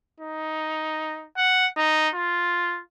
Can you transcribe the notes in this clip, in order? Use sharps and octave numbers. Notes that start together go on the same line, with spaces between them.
D#4
F#5
D#4
F4